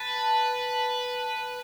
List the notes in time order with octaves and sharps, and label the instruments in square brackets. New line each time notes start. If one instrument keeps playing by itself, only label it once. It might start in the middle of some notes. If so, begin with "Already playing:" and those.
Already playing: [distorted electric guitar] B4 [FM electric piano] A5